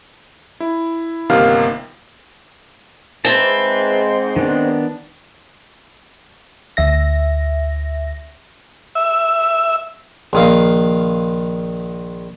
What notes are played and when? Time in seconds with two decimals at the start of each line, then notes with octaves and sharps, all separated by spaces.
0.60 E4
1.30 G1 C3 D#3 A#3 F5
3.25 G#2 C4 B4 E5 A5
4.36 D#3 B3 D4
6.77 D2 E5 A#6
8.95 E5
10.33 A#1 D#3 F5